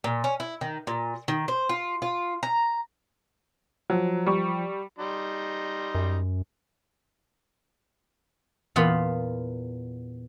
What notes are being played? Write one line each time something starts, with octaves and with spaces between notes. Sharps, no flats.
A#2
C#4
E4
D#3
A#2
D#3
C5
F4
F4
A#5
F3 F#3
G3 C#6
G3 D#4 C6
F#2
E2 A#2 B3 F4 F5 B5